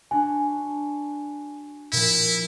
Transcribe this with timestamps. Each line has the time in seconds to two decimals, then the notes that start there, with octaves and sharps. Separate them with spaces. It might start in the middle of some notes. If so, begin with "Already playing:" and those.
0.11 D4 F#4 G#5
1.92 A#2 F3 E4